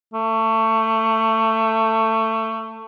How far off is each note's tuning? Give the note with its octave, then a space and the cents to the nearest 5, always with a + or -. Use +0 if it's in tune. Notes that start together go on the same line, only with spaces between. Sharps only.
A3 +20